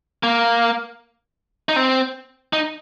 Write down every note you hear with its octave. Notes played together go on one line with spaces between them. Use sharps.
A#3
D#4
C4
D#4